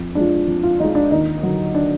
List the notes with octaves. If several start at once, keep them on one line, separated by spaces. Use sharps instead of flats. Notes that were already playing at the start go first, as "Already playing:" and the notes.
Already playing: F2
F3 G#3 D4
F2
F4
F3 G#3 D#4
D4
D#2 D#4
D3 F#3
D4